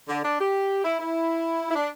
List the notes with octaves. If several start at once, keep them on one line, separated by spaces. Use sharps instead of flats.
D3
D4
G4
E4
E4
E4
D4